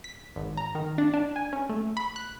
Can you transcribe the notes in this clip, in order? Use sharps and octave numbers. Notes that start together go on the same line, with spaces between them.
B6
G#1
A#5
D#3
D4
D4
G#5
C#4
A3
B5
F#6